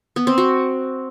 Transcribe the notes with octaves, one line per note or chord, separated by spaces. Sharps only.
B3
C4
F#4